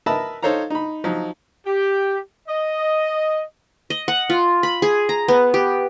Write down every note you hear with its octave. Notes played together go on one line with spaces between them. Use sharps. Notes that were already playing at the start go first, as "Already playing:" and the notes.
A#4 B4 D#5 E5 A5 B5
D#4 A4 C5 C#5 F5 A#5
D#4 B5
F3 F#3 D#4
G4
D#5
D#5
F#5
F4
B5
G#4
A#5
B3
G4